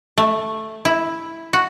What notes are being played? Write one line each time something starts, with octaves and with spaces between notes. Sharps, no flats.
A3
E4
F#4